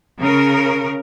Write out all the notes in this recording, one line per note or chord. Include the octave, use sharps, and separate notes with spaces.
C#3 A#4